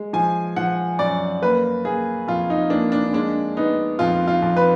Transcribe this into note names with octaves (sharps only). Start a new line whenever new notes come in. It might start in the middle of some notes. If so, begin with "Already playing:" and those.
Already playing: G#3
F3 G#5
F3 F#5
F#2 D5
A#3 B4
A#3 G#4
F2 F4
D#4
A#3 D4
D4
G#3 D4
B3 D#4
F2 F4
F4
F2
B4